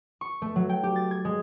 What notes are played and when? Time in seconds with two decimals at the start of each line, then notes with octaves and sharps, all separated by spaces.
0.21 C#6
0.42 A3
0.56 F#3
0.69 G5
0.83 G4
0.96 A6
1.11 G#6
1.25 G#3